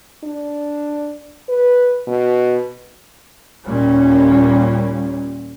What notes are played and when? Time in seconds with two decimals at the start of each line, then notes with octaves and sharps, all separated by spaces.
0.24 D4
1.49 B4
2.07 B2
3.66 D#2 A#2 G3 C#4